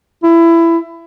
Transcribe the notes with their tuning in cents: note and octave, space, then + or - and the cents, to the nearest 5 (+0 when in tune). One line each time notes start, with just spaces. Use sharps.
E4 +20